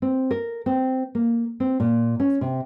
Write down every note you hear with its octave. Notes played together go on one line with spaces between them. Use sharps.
C4
A#4
C4
A#3
C4
A#2
C#4
C3